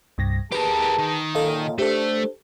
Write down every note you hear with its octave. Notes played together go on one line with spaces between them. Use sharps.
C2 G2 A#6
G4 G#4 A#4 B4 A5
D#3
F#2 A#2 A4 D#5 F5
A3 D4 G4 A4 C5